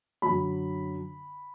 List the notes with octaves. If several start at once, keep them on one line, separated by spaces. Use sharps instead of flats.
F#2 D3 F#3 B5